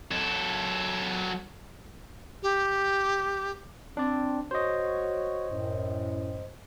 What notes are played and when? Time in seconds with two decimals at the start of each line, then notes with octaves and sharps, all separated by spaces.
0.11 F#3 A4
2.43 G4
3.97 C4 D4 D5
4.51 F#4 C5 C#5 D#5
5.49 F#2 A2